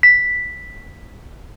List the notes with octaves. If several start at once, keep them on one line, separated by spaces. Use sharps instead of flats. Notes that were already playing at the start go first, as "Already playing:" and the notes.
B6